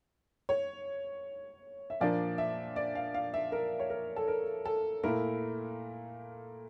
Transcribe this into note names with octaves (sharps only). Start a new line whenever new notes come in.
C#5
E5
A#2 F3 A#3 D4 D5
E5
D5
F5
F5
E5
A#4
C#5
A#4
A4
A#4
A4
A#2 A3 E4 A#4